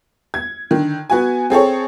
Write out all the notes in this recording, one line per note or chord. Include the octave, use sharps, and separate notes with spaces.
G#6
D3 D#3
B3 F#4 G#5
C4 G#4 A4 C#5